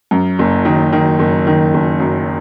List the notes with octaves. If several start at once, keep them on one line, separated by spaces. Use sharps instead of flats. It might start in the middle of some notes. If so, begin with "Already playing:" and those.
F#2
F#1
D#3
D#3
F#1
D#3
F#1
F#2